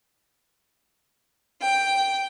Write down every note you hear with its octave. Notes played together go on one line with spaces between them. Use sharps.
G5